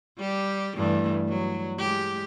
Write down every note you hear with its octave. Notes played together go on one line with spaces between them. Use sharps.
G3 G4
G2 E3 A3
F#3
G#3 G4